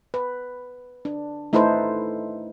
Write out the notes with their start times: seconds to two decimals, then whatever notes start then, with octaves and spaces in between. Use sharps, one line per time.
0.14 B4
1.05 D4
1.53 A3 D#4 E4 A4 B4 C5